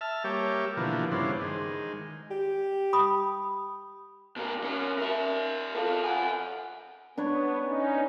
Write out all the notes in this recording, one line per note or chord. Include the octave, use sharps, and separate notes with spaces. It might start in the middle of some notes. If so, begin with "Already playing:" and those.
E5 A5 F6
G3 A#3 G4 C#5 E5
B2 D3 E3 F3 A#3
G2 C#3 E3 B3 D4 C5
D#3 G#3
G4
B5 D#6
B2 A#4
C#4 A#4
A#4 E5
F4 A4
F#5 G#5
B3 D4 B4 C#5
C#4 D#4